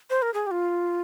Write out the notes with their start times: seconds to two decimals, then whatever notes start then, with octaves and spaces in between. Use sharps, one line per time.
0.10 C5
0.22 A#4
0.34 G#4
0.47 G4
0.51 F4